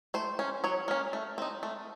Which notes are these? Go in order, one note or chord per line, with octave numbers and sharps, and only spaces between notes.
A3 C5
C#4
F#3 C#5
A#3 C#4
A3
C4 D#4
A3